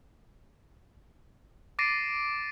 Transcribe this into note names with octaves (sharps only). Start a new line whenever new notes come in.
D6 A6 A#6 C7 D7 D#7